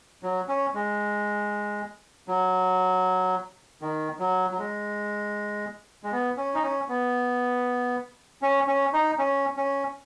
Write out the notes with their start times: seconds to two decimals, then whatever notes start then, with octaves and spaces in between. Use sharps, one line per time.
0.23 F#3
0.48 C#4
0.74 G#3
2.28 F#3
3.81 D#3
4.19 F#3
4.51 F#3
4.58 G#3
6.03 G#3
6.12 B3
6.37 C#4
6.54 D#4
6.62 C#4
6.88 B3
8.42 C#4
8.67 C#4
8.93 D#4
9.19 C#4
9.57 C#4